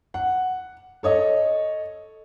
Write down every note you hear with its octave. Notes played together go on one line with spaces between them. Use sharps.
F#5
A4 C#5 D#5